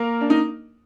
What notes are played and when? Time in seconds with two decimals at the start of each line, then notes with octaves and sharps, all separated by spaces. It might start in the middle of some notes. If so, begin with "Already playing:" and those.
Already playing: A#3 A#4
0.21 D4
0.30 D#4